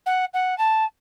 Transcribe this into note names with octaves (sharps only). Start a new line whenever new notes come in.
F#5
F#5
A5